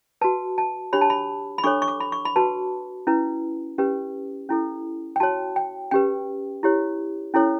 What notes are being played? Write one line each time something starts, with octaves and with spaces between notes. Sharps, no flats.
F#4 B4 A5
A5
D4 G4 C#5 B5
A5
B5
B5
D4 A4 C#5 C#6
C#6
D6
B5
C#6
B5
F#4 B4 A5
C#4 E4 B4
C#4 G4 B4
C#4 E4 A4
G5
F#4 C#5 A5
G5
C#4 G4 B4 G5
E4 G4 C#5
C#4 E4 A4 C#5